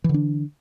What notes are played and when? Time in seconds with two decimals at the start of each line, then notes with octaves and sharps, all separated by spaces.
0.04 E3
0.09 D3
0.14 D4